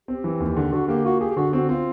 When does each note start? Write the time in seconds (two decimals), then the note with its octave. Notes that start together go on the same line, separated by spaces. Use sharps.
0.08 C4 G4
0.24 E3
0.40 D#2
0.57 D3
0.72 D3 F#4
0.88 A#3 G4
1.05 F4 F#4
1.20 G4 G#4
1.31 G4
1.37 D3 F#4
1.53 C4 F#4
1.69 C4 F4